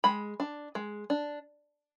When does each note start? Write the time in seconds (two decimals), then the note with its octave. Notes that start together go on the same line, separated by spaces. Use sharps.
0.04 G#3 B5
0.40 D4
0.75 G#3
1.10 D4